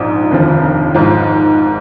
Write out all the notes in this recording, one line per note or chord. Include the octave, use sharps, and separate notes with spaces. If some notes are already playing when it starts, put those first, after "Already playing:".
Already playing: A#1 G#2 F3 C4
F1 D#2 D3 F3
G#1 G#2 F3